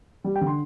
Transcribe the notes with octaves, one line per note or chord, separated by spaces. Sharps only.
G3
G5
D3
C6